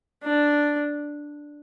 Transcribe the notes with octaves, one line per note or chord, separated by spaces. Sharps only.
D4